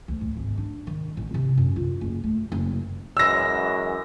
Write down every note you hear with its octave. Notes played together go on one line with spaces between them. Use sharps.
D2
A2
G#1
D4
D#3
A1
C3
F#2
F4
F#1
A3
F#1
F#2 E3 G#3 E6 A#6